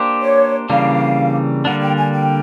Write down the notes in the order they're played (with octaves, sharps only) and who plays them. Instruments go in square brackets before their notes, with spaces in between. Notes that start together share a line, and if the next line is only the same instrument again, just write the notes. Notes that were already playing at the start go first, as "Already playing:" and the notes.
Already playing: [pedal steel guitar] A#3 D4 G4 C5
[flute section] C#5
[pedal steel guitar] C#3 E3 G3 A#3 D4 [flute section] F5
[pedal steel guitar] D3 G3 A#3 D4 [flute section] F#5
[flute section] G5
G#5
G5